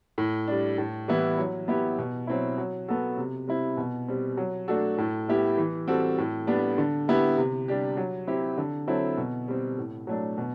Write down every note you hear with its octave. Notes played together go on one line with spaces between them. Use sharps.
A2
G3 D4
A2
E3 G3 B3 E4
F#3
B3 E4 G4
B2
F#3 C4 E4
F#3
B3 F#4 A4
C3
G3 C4 E4
B2
G3 C4
F#3
A3 D4 F#4 A4
A2
G3 B3 E4 G4
E3
G3 C4 F#4 A4
A2
G3 B3 D4
D3
G3 B3 E4 G4
C3
G3 D4 G4
F#3
C4 E4 G4
D3
F#3 C4 E4 A4
B2
G3 C4
A2
F#3 A3 D4
B2